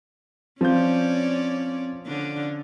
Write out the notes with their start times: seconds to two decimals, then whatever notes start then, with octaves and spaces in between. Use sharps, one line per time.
0.61 F3 C4 C#4 F4 C#5 D5 G6
2.06 D3 C#4 D4